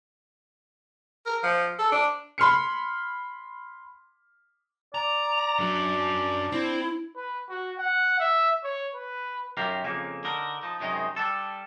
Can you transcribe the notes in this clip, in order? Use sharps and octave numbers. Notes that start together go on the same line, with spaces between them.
A#4
F3
A4
D4
B5 C6 F6 C#7
D5 A#5
F#2 F#3 D4
C4 E4
B4
F#4
F#5
E5
C#5
B4
F#2 D#3 G4 A#4 F5 A#5
F2 C#3 A#3
D3 D#4 A#4
F3 D#4
F#2 C3 D#3 G#3 D#4
G3 D4 A4